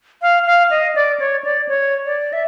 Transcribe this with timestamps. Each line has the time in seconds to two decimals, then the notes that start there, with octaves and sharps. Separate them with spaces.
0.22 F5
0.46 F5
0.71 D#5
0.95 D5
1.19 C#5
1.44 D5
1.68 C#5
2.05 D5
2.33 E5